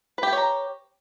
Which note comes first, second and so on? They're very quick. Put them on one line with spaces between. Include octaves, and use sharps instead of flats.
B4 G4 G5 C#5 A#5